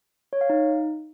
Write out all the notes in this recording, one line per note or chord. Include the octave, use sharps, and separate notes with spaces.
C#5
F5
D#4